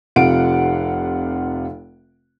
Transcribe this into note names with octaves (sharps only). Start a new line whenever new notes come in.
F1 C3 F4 F5 F#5 D7